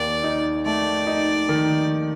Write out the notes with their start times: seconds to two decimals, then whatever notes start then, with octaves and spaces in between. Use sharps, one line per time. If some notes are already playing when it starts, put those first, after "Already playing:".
Already playing: D#2 D5
0.24 D#4
0.66 A3 D5
1.07 D#4
1.49 D#3